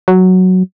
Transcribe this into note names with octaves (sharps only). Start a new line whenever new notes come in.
F#3